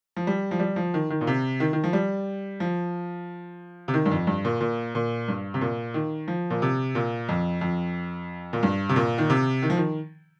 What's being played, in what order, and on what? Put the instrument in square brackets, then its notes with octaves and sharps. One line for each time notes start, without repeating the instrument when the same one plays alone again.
[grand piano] F3
G3
F3
G3
F3
D#3
D#3
A#2
C3
D#3
D#3
F3
G3
F3
C3
D#3
G2
F2
G2
A#2
A#2
A#2
G2
C3
A#2
D#3
F3
A#2
C3
A#2
F2
F2
A#2
G2
C3
A#2
D#3
C3
D#3
F3
D#3